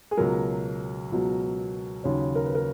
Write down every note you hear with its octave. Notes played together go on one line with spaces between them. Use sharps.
G#4
C#2 B2 F#3 A#4
C#2 B2 F#3
D#2 C#3 F#3 C#5
A#4
B4
A#4